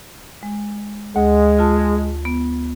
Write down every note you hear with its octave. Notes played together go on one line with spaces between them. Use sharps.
G#3
D2 G#3
F4 A5
B3